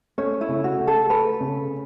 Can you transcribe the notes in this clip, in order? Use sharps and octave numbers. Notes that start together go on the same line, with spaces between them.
A3 C#4 C#5
E4
C#3
F#4
A3
A4
A3 B4
C#3